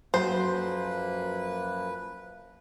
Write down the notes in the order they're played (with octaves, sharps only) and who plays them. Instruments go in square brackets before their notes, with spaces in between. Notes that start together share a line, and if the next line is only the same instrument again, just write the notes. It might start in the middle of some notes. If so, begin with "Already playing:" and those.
[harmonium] F#2 F3 A#3 [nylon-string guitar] F#3 F#4 A4 [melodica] B4 [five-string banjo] C5